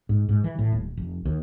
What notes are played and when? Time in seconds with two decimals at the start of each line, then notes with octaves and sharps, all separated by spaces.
0.09 G#2
0.29 G#2
0.44 E3
0.59 A2
0.72 D#1
0.97 F1
1.25 D#2